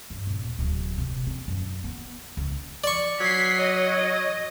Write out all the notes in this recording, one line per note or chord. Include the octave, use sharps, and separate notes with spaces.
G2
D#1
D1
C3
C4
F#2
B3
C#2
D5 C#6
F#3 G#6 B6 C7
C#5 D#5